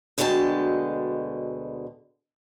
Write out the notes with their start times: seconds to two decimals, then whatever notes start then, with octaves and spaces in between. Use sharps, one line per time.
0.18 D2 B2 D3 G#3 G5 A5